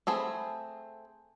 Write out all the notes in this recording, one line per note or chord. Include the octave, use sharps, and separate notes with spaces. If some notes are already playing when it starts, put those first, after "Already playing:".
A3 C4 G#4 B5